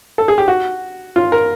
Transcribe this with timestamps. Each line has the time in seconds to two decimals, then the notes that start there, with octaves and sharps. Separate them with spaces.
0.18 A4
0.28 G#4
0.38 G4
0.48 F#4
1.16 F4
1.32 A#4